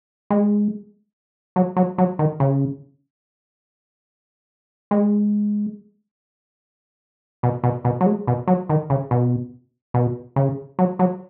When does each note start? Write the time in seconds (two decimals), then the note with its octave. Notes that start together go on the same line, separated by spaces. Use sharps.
0.30 G#3
1.56 F#3
1.77 F#3
1.98 F#3
2.19 D#3
2.40 C#3
4.91 G#3
7.43 B2
7.64 B2
7.85 B2
8.01 F#3
8.06 G#3
8.27 B2
8.48 F#3
8.69 D#3
8.90 C#3
9.11 B2
9.94 B2
10.36 C#3
10.79 F#3
10.99 F#3